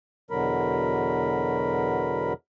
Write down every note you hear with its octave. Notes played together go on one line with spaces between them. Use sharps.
E2 B2 D3 F#3 A#4 B5